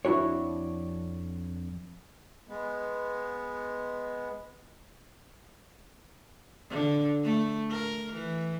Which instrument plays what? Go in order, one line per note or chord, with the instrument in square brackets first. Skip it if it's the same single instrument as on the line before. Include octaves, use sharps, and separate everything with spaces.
[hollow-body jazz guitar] F2 D4 E4 F#4 C#5
[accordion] G#3 B3
[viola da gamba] D3
A3
A#4
E3